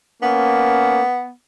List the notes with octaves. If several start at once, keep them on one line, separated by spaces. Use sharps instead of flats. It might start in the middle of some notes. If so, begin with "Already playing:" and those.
A#3 B3 C#4